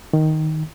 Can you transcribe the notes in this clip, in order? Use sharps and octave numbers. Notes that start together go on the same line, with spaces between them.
D#3